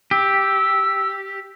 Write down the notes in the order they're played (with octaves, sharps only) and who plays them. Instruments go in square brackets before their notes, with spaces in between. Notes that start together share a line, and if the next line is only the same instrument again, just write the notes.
[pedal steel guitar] G4 [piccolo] E6